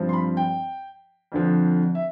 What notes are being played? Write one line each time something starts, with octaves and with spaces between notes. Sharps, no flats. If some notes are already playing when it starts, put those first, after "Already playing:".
Already playing: G2 F3 C4
C6
B5
G5
F2 D3 F3
E5